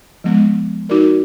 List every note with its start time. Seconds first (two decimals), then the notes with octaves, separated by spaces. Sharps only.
0.24 F3 G#3 B3
0.89 D#4 F#4 A#4 D5